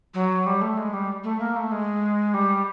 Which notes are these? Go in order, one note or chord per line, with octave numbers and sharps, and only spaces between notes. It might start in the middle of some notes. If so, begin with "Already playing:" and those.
F#3
G3
A3
G#3
G3
A3
A#3
A3
G#3
G3